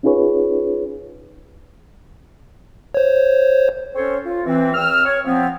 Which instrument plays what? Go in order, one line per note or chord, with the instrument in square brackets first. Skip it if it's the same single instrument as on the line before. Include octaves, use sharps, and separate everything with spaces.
[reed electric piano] C#4 D#4 F4 G#4 B4 C#5
[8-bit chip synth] C5 C#5
[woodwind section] C4 C#4 A4 C5 C#5
F4
E3 C4
E2 C4 E6 F6
C#5
F3 B3 C4